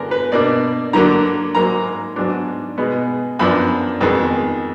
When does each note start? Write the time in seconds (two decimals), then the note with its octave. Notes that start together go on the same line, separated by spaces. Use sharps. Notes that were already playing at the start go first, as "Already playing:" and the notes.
Already playing: D3 G#3 B3 D4 A#4
0.11 B4
0.32 B2 A#3 D4 D5
0.93 D3 F#3 A#3 D4 A#5
1.55 G#2 F#3 A#3 A#5
2.16 G#2 F#3 B3 D4
2.78 B2 G#3 B3
3.39 F#2 F3 B3 D4 B5
4.01 F2 D#3 G#3 B3